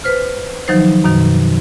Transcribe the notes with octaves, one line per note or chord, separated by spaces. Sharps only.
B4 C5 F6
D#3 F3 F#3 D#4 C5
F#2 B2 D#3